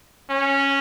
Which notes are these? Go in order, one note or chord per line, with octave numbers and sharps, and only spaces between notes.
C#4